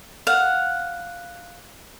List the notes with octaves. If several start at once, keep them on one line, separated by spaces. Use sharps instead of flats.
F5 F#5